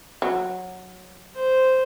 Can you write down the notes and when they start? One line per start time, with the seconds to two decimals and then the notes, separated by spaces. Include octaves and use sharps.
0.22 F#3
1.36 C5